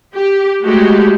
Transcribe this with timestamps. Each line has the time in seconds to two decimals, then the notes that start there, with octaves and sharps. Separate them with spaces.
0.15 G4
0.63 G#3 A3 F#4 G4